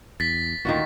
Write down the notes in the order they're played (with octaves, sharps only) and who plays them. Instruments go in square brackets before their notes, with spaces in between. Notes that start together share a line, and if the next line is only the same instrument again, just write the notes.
[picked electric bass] E2 [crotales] A6 B6
[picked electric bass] D2 A#2 [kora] D#3 F4 F#4